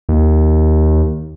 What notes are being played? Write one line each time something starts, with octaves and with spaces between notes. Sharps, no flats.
D#2